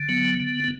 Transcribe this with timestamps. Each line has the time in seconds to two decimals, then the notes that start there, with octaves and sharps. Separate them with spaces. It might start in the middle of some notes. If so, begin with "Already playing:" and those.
Already playing: D3
0.09 F#3 B3
0.40 D3
0.64 B3